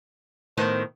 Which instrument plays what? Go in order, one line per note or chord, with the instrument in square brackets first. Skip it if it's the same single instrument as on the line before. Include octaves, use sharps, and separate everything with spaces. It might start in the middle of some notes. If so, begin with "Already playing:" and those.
[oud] A2 D#3 B3 [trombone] C5